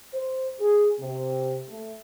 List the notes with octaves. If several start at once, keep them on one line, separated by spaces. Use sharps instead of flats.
C5
G#4
C3
A3